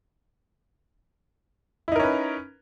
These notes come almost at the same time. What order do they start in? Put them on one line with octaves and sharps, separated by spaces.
E4 D#4 A#4 C#4 B4